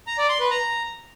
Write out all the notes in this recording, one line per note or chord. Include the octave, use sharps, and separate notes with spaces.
A#5
D5
C6
B4
A#5